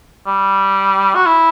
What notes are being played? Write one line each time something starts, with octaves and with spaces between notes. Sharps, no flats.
G3
F#4
E4